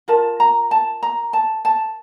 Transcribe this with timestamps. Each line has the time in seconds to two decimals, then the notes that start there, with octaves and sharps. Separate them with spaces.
0.08 F4 A#4 A5
0.40 A#5
0.71 A5
1.03 A#5
1.33 A5
1.65 A5